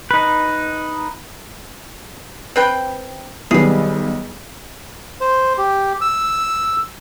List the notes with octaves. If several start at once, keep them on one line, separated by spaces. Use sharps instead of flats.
D#4 B4
C4 B4 G5
B1 D#3 G3 G#4 B4
C5
G4
E6